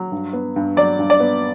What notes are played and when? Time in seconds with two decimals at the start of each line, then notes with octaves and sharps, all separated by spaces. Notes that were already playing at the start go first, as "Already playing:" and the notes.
Already playing: F#3
0.12 G2
0.33 B3
0.56 G2
0.77 F#3 D5
0.99 G2
1.10 D5
1.20 B3